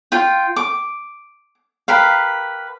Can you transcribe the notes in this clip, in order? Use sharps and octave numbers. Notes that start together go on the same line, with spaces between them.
F4 G5
D6
G4 A#4 B4 F5